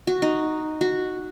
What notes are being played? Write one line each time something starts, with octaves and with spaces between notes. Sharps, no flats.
F#4
D#4
F#4